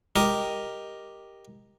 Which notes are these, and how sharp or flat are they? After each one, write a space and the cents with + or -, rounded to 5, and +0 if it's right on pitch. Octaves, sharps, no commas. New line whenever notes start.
G4 +0 A#4 +0 D#5 +0